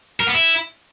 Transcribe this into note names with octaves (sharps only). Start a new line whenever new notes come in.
A#4
B3
E4